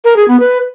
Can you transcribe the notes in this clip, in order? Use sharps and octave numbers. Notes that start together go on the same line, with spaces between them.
A#4
G#4
B3
B4